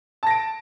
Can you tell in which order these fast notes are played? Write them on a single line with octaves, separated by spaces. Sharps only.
A5 A#6 D7